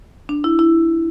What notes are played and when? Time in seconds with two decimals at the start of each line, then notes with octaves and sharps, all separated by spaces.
0.29 D4
0.44 E4
0.59 E4